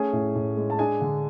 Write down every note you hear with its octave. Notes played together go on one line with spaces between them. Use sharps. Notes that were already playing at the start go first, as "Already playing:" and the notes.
Already playing: A3 C#4 G#4 G#5
A2
A2
G#3
A5
D4 G#4 G#5
D3